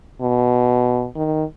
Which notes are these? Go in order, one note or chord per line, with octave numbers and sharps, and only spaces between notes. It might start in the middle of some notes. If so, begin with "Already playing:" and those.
B2
D#3